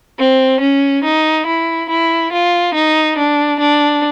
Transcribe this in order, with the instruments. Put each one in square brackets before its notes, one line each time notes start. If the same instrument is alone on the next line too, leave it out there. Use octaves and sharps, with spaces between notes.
[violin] C4
C#4
D#4
E4
E4
F4
D#4
D4
D4